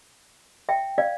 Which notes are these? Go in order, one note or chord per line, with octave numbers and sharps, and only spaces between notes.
E5 G5
D5 F5